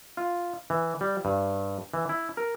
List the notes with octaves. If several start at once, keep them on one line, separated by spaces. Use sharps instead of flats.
F4
E3
G3
G2
E3
E4
A#4